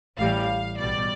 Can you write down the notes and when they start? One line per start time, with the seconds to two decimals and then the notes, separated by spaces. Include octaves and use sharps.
0.17 A1 A2 E3 G3 F5
0.78 B1 B2 G3 D5